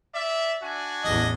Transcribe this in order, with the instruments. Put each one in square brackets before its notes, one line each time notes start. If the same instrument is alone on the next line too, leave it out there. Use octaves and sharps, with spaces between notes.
[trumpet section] D5 E5
D4 F#4 G#5
[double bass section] A1 E2 [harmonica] D#5